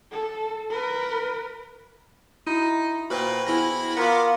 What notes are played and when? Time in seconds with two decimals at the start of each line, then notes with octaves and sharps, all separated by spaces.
0.12 A4
0.71 A#4 B4
2.47 D#4 E4 F#4
3.10 A#2 F#4 B4 C5 G5 B5
3.47 E2 E4 B5 A#6
3.97 B3 F4 A#4 F#5 D6